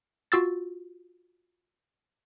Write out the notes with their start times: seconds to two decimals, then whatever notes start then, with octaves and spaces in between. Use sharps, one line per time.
0.32 F4 F#4 E6 A6